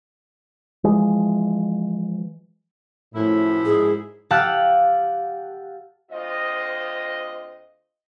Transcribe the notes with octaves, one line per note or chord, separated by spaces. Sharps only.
E3 F3 G#3
F#2 A2 F3 E4
G#2 G#3 G#4
G4 F5 F#5 A5 E6
D2 C4 F4 D#5